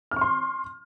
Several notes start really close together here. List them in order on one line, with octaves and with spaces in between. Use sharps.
F6 C#6 C6